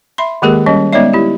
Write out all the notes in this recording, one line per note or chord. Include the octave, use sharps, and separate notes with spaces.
E5 B5 C6
D#3 G#3 A#3 G4 G#4 A#4
G3 C#4 D#5
G#3 B3 D#4 C#5 D5 E5
E4 G4